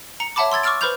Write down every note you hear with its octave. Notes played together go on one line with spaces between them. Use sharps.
A#5 C#7
C#5 E5 F#5 A5 B5 D6
C6 E6 G#6 A6
C#6 D6 E6 F6 A6 D7
B4 C5 B5 F6 G6 F7